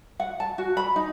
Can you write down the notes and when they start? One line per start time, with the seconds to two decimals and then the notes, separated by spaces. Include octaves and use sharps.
0.20 F#5
0.40 A5
0.58 F#4
0.77 B5
0.96 D#4